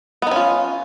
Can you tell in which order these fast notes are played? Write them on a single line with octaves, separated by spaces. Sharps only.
B3 D#4 C#4 F4